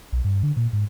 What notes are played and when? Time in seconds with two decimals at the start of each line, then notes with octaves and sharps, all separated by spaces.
0.12 B1
0.24 G2
0.43 D3
0.57 A#2
0.73 G#2